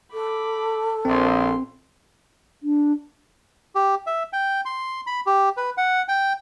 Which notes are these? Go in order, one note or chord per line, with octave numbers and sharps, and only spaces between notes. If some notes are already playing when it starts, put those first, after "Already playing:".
A4 B5 D6
A#1 C4 F5 C6
D4
G4
E5
G5
C6
B5
G4
B4
F#5
G5